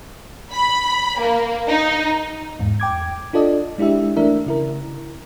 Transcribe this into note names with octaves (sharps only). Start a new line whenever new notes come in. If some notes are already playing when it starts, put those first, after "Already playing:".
B5
A#3
D#4
E2 G#2
G5 D6 G#6
D4 F4 A4 D5 D#5
G#3 D4 E4 G4 E5
E3 A3 D4 A#4 E5
C#3 E4 A#4